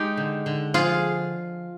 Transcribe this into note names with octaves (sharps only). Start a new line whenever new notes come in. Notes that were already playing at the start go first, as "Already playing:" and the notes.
Already playing: G#3 D#4 G4
D3
D3
F3 F4 G#4